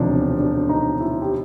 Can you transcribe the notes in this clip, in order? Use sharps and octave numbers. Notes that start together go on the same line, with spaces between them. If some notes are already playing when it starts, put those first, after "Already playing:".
Already playing: E1 D2 C3 F3 D4 D#4
D4
D#4
E4
G4